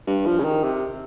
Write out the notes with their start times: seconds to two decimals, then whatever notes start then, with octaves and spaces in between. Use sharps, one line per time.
0.07 G2
0.26 F3
0.40 C#3
0.44 D#3
0.64 C3